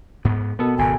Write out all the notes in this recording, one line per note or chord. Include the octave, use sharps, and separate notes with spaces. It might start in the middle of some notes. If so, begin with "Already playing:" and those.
G#2 B3
B2 B3 A4 A#4
G#1 C#3 G#5